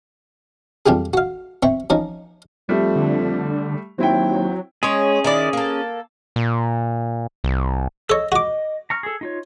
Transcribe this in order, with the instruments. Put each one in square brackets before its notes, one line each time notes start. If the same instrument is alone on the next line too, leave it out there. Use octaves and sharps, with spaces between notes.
[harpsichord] F2 G3 F4 G4 G#4
F#4 F5
C4 E5 C#6
F3 C#4 D#4
[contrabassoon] F2 [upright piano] G3 A3
[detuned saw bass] D3
[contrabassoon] D#2 [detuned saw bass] F#3 [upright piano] C4 E4 G5
[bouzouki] G#3 C#5 [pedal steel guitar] C#4 G#4
[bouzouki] D#3 E4 D5
A#3 A4
[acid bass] A#2
C2
[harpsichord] A4 C#5 [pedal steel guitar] D#5 E6
[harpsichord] F#4 D6 [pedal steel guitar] D#5
[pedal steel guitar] A#5 C#6 F6
G#4 A4
D#4 F4 C#5